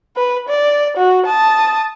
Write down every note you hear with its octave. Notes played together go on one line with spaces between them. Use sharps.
B4
D5
F#4
A5 D#6